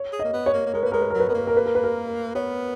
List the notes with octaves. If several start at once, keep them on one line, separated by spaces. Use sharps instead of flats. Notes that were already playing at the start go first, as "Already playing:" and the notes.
Already playing: C#5
G#4
D#5
A#3
B3
C#5
A#3
A#3
G#3 A#4
A#3 B4
G#3 A#4
B4
F#3 A#4
B4
B3 A#4
A#3 B4
A#4
B4
A#4
B4
A#4
B3 C#5